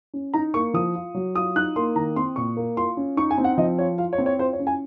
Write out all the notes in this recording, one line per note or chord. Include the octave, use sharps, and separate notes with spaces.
C#4
D#4 A#5
A#3 C#6
F3 D#6
F4
F#3
F4 D#6
D#4 F#6
A#3 C6
D#3 A#5
C4 C6
A#2 C#6
A#3
F4 C6
C#4
D#4 C#6
G#5
C4
F#5
F3 D#5
F4 C#5
F4 F5
C#5
C4
C#5
F4 C5
C#5
C#4
G#5